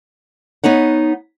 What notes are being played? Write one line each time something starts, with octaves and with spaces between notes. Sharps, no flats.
B3 D#4 C#5 F#5